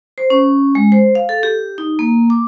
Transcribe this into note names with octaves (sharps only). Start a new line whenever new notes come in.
C5
C#4
G#3
C5
F5
A4
G4
D#4
A#3
D6